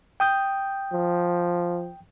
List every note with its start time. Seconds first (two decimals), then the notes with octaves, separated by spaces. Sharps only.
0.20 G5 D#6 G6
0.93 F3